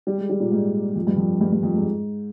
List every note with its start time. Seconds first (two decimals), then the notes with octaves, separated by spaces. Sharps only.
0.07 G3
0.18 G#3
0.30 G3
0.40 A#2
0.51 G#2
0.96 F2
1.07 G2
1.17 F2
1.41 G2
1.52 G2
1.63 F2
1.74 G#2